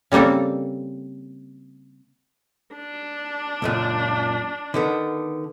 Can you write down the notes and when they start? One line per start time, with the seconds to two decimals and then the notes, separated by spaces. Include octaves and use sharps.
0.12 C#3 G3 A#3 C4 A4
2.75 D4
3.62 C#2 F#2 A#2
4.74 D3 D#3 B3